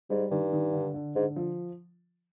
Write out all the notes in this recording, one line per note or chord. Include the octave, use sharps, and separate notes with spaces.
G#2 G3
G2 D#3
D#3
D3
D3
G#2 D3
F3